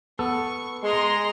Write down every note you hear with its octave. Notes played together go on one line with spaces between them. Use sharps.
B3 A4 C#6
G#3 A#5 C6